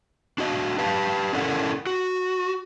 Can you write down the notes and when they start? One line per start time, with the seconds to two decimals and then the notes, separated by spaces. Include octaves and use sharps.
0.38 D4 F#4 D#5
0.78 G4 B4 F5 A5
1.33 C#4 D4 E4 A4 A#4 F#5
1.87 F#4